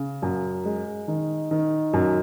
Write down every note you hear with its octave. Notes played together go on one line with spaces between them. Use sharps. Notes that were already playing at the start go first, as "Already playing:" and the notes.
Already playing: C#3
F#2
G#3
D#3
D#3
F#2